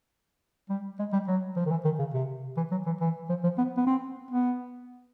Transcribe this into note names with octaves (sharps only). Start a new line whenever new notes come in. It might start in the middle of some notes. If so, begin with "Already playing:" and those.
G3
G#3
G3
F#3
F3
D#3
E3
D#3
C#3
C3
E3
F#3
E3
E3
F3
F3
B3
B3
C4
B3